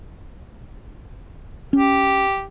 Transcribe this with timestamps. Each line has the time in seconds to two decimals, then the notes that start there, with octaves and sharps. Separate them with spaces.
1.73 C#4 G4